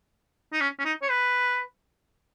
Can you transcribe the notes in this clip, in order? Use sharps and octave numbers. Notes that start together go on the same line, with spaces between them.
D#4
C#4
C#4
D#4
C#5
B4